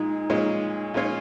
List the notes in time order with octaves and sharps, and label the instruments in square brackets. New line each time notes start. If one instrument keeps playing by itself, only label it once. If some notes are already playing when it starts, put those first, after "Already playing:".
Already playing: [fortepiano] A#2 G#3 [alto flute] D#4
[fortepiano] A#2 G#3 C#4
[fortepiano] A#2 G#3 C#4 F4 [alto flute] D#4